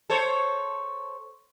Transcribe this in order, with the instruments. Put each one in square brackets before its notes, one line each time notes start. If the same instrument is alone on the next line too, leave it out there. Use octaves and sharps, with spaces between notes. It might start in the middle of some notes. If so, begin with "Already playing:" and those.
[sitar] A4 C5 C#5